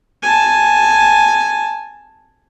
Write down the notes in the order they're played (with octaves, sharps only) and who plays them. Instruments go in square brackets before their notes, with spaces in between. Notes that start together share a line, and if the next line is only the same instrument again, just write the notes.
[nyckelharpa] G#5 A5